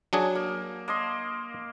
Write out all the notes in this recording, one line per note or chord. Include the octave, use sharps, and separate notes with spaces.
F#3 D4 G#4
A#3
A#3 D#5 C6